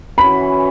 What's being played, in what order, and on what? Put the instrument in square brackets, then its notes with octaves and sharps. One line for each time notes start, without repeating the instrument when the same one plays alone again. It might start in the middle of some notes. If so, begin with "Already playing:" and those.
[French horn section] E3 C#4 F#4 [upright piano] B5